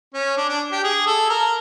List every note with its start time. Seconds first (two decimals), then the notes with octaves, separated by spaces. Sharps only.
0.14 C#4
0.37 D4
0.49 D4
0.72 G4
0.84 G#4
1.07 A4
1.30 A#4